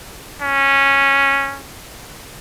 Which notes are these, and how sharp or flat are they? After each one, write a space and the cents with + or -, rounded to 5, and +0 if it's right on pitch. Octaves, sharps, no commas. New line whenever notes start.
C#4 -10